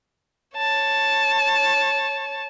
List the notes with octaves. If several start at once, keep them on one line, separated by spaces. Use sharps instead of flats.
C#5 A5